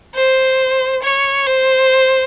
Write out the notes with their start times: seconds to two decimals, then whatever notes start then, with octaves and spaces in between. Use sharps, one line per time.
0.15 C5
1.03 C#5
1.46 C5